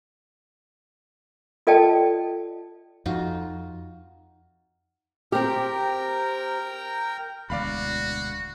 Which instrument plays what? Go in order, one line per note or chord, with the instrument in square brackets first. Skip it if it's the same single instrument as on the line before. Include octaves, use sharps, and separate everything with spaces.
[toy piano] F4 A4 D5 D#5 G5 A5
[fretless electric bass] F2 [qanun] D#4 F4 F#4
[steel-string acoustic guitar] C4 G4 [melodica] A#4 G5 A#5
[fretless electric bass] E1 D2 [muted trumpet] F#4 [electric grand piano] D5 F5 B5